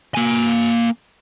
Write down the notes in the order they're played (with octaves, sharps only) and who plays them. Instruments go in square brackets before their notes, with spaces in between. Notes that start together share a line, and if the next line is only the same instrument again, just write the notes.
[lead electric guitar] A#3 G#5